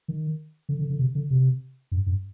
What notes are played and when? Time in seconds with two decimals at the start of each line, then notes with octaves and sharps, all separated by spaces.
0.08 D#3
0.69 D3
0.79 D3
0.90 D3
0.99 C3
1.15 D3
1.31 C3
1.92 G2
2.06 G2